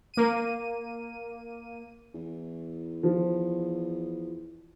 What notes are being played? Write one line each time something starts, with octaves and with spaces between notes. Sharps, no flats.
A#3 D#7
E2
F3